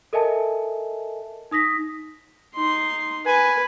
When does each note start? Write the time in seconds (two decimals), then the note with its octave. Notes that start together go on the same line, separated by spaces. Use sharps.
0.13 A4 A#4 D#5 E5 G#5 A5
1.51 D#4 D#6 A#6 B6
2.55 D#4 C6
3.26 B4 G#5